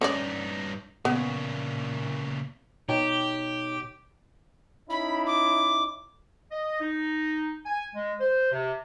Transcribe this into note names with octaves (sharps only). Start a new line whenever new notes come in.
G2 C#4 D#4 C#5 D5
A#2 C#3 B3
B2 D#4 G4 C#5 G5
C#4 D#4 E4 B5
D6
D#5
D#4
G#5
G#3
C5
C3